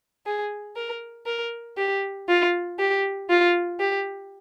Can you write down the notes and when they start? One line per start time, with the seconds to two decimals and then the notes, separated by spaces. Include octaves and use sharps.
0.26 G#4
0.76 A#4
1.26 A#4
1.77 G4
2.29 F4
2.79 G4
3.30 F4
3.80 G4